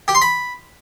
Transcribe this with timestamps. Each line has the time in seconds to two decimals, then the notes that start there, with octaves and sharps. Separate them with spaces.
0.08 G4
0.15 C6
0.22 B5